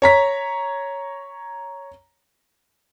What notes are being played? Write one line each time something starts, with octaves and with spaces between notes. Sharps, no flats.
C#5 A#5 B6